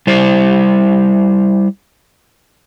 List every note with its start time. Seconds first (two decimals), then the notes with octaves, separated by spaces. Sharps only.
0.07 G3 E4 C5